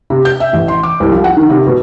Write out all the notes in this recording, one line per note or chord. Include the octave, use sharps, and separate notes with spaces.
C3
G6
E5
A1
C6
D6
C2
F3
F#5
D#3
C3
B2